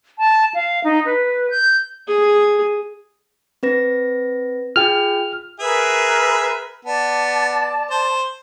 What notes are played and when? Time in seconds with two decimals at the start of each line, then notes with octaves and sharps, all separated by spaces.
0.19 A5
0.54 F5
0.84 D#4
1.06 B4
1.50 G6
2.08 G#4
3.63 C4 B4 A#6
4.76 F4 G#4 G5 F6
5.60 G#4 A#4 B4 E5
6.85 B3 D5 A5
7.91 C5